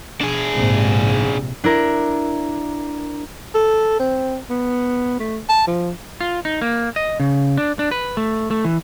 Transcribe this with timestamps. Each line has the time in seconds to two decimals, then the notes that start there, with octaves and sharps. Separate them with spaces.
0.21 D4 G#4
0.54 A#1 G#2 C3
1.64 D4 E4 A#4
3.55 A4
4.00 C4
4.50 B3
5.20 A3
5.49 A5
5.67 F3
6.21 F4
6.45 D#4
6.61 A#3
6.96 D#5
7.20 C#3
7.57 D4
7.79 D4
7.91 B4
8.17 A3
8.51 A3
8.65 E3